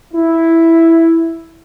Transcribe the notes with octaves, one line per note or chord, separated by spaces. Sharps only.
E4